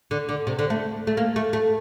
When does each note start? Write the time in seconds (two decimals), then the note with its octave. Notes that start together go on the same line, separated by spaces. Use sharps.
0.11 D3
0.29 D3
0.47 C3
0.59 D3
0.70 A3
1.07 A3
1.17 A#3
1.36 A3
1.53 A3